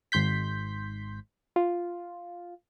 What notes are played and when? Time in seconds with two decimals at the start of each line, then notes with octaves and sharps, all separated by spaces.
0.12 G#1 G#2 C6 G6 B6
1.56 F4